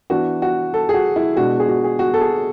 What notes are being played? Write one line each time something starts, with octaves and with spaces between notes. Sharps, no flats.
E3 B3 D4 F#4
F#4
A4
G#4
F#4
E4
B2 G#3 D4 F#4
G#4
F#4
G#4
F#4
A4
G#4